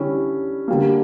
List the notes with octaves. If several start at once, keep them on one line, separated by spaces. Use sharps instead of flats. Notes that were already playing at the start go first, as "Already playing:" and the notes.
Already playing: D3 G3 C#4 E4
D3 G3 A#3